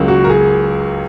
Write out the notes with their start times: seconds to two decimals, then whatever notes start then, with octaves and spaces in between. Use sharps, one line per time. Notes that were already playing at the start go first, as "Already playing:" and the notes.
Already playing: C#2 C#3 F#3 A#3
0.08 F#4
0.24 A#4
0.30 G#4